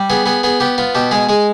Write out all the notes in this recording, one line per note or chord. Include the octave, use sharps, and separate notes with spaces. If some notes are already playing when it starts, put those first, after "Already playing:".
Already playing: G3
B3 G#4
B3 G#4
B3 G#4
B3 G4
B3 F4
B2 G4
G#3 G#4
G#3 G#4